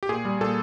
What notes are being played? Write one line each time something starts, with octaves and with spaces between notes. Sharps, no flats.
G4
A#2 G#4
G3
A#2 A4